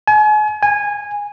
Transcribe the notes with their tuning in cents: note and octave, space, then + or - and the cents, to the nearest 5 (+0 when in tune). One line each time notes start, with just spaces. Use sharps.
G#5 +40
G#5 -15